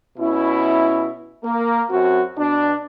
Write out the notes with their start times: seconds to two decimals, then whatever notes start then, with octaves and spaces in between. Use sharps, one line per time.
0.17 B2 C#4 E4
1.44 A#3
1.89 F#2 C4 F#4
2.38 B2 D4